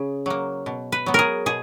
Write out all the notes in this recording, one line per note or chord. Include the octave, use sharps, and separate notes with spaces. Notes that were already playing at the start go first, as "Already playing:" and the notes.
Already playing: C#3 G#4
F#3 A#3
B2
B4
F#3 B3
G#4 A#4
B2 G#4